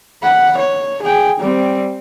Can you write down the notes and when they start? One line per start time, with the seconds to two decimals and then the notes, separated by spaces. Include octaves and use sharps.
0.23 F#5 B5
0.57 C#5
1.03 G#4 G5
1.40 G3 C4